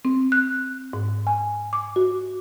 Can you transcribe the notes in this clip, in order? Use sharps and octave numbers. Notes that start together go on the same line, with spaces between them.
C4
F#6
G#2
G#5
D6
F#4